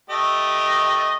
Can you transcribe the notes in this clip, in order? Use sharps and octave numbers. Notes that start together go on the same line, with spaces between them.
A3 G4 D#5